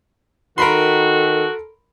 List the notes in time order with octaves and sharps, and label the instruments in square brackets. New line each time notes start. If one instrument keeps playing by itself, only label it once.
[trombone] D#3 [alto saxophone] F#4 [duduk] A4 [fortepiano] A#4 B5 C6